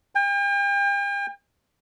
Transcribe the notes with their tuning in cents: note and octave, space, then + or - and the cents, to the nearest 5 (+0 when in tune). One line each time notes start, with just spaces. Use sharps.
G5 +40